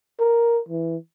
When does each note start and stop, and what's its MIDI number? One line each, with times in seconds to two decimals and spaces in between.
0.19 0.59 70
0.69 0.96 52